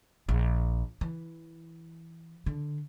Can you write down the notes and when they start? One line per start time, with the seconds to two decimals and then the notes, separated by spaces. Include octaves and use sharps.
0.29 A#1
1.01 E3
2.46 D3